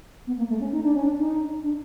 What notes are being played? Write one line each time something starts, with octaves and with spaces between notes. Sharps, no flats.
B3
A#3
A3
C#4
D#4
D4
C#4
D4
D#4
D4